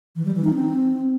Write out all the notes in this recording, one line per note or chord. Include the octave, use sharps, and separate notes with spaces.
E3
G3
E3
D#4
C4